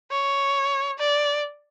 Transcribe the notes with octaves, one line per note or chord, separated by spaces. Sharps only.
C#5
D5